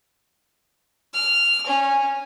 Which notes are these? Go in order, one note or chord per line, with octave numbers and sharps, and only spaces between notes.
F6
C#4